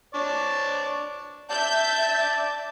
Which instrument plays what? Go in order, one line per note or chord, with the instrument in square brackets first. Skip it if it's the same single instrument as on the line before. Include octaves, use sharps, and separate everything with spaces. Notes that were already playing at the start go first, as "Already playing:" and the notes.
[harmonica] D4 C#5 D5
[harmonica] D5 A5 [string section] E5 G6